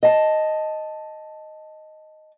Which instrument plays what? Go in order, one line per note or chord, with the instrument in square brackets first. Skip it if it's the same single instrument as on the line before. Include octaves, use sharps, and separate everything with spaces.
[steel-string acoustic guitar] D#5 A5